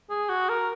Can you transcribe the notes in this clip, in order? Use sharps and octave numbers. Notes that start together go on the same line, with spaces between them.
G#4
F#4
A#4